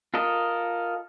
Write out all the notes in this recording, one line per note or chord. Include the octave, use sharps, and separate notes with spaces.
F4 A4 A#4 D#5